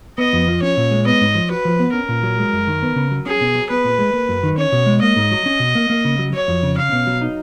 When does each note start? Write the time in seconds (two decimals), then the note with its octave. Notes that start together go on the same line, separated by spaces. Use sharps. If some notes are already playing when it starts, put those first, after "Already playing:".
0.18 B3 D#5
0.33 F2
0.48 F3
0.62 C#4 C#5
0.77 A#2
0.91 G#3
1.06 B3 D#5
1.21 G#2
1.35 F3
1.50 F#4 B4
1.65 F3
1.80 B3
1.94 C#4 A#4
2.09 A#2
2.23 F#3
2.38 G#3
2.53 F#2
2.67 D#3
2.82 B3
2.96 C#3
3.11 F#3
3.26 C#4 G#4
3.41 B2
3.55 F#3
3.69 B3 B4
3.84 A#2
3.99 G#3
4.14 A#3
4.29 F#2
4.43 D#3
4.58 C#4 C#5
4.72 B2
4.86 G#3
5.02 A#3 D#5
5.16 G#2
5.31 F#3
5.46 C#4
5.60 B2
5.75 A#3
5.90 A#3
6.05 C#3
6.19 F#3
6.33 F#3 C#5
6.48 F2
6.63 C#3
6.77 C#4 F5
6.92 B2
7.07 F#3
7.21 D#4